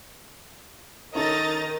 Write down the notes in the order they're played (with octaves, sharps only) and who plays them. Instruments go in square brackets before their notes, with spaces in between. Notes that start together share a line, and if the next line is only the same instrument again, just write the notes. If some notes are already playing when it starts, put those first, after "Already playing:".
[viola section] D#3 [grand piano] C#4 D#4 A4 [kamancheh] D#5 [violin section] A#5 A6